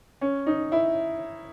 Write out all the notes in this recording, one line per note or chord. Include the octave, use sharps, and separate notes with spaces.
C#4
D#4
E4